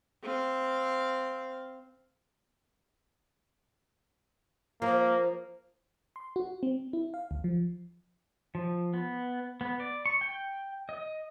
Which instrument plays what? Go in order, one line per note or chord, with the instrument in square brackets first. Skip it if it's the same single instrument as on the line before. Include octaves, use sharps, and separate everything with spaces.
[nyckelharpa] C4 F5
[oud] F3 [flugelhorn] A#3
[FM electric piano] C6
F#4
C4
E4
F5
D2
F3
[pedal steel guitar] F3
B3
B3
D5
C#6
G5
D#5